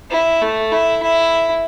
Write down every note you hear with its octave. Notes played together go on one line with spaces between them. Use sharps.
E4
A3
E4
E4